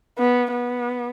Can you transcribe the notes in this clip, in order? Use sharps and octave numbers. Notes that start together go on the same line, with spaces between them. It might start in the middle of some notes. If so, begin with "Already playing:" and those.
B3
B3